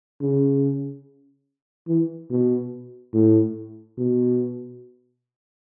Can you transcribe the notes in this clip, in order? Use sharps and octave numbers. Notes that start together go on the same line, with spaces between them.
C#3
E3
B2
A2
B2